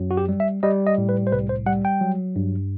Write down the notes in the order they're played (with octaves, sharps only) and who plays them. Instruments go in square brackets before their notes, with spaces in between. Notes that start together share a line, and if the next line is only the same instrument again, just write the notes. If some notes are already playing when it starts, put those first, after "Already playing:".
Already playing: [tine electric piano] F#2 F#3
F#4
G4
G3
E5
G3 D#5
D#5
A2
B4
C5
C2 B4
C5
G3 F#5
G5
F#3
G2